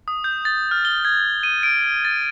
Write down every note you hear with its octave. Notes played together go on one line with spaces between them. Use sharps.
D#6
G6
A6
F6
G7
G#6
D#7
D7
A6